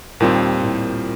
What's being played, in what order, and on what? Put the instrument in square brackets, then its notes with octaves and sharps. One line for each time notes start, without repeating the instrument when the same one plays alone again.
[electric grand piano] D#2 D#3 G3 C4 [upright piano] A#2
[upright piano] A2